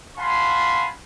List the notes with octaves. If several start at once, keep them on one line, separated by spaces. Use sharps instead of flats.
F5 F#5 G#5 A5 B5 C6